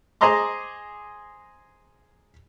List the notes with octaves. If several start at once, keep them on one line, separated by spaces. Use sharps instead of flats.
G#4 C5 D#5 A#5 C6 D6